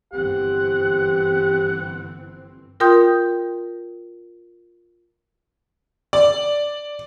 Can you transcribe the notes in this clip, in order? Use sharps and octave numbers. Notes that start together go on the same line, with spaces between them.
G1 E3 C4 G4 F#5
F4 A#4 G5 C6 D#6 G6
D5